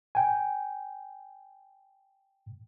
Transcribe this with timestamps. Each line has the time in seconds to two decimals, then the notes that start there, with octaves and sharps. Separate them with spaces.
0.15 G5 G#5